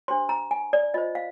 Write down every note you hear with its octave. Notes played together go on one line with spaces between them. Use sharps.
D4 G4 C5 C6
A#5
G#5
D5
F4 C5 D#5
F5